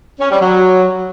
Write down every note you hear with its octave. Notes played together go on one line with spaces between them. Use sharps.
C#4
G3
F#3